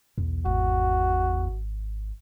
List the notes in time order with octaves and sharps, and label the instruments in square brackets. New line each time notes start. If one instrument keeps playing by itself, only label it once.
[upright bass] B1 [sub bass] E2
[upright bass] G#1 [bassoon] F#4